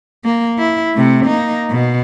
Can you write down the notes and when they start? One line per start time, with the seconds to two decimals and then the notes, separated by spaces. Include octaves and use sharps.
0.24 A#3
0.58 E4
0.94 C3 A3
1.26 A#3 D#4
1.70 B2